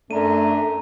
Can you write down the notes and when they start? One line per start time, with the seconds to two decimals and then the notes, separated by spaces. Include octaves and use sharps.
0.11 F#2 A3 D4 A#5 D#7